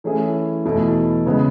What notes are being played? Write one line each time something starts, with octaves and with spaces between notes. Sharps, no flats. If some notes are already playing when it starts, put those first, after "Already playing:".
E3 A3 C#4 E4 G#4
E2 B2 A3 E4
C#3 G#3 B3